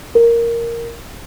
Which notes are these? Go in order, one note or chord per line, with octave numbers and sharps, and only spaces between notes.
A#4